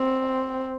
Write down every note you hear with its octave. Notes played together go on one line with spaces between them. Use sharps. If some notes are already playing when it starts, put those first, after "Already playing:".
Already playing: C4